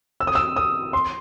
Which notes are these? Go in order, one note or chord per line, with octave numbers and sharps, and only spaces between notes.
E6
D#6
E6
D#6
C6